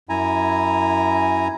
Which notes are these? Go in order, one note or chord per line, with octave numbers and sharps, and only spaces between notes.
F#2 E4 G#5 A#5